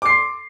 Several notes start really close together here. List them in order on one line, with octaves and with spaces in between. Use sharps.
D6 C7 C6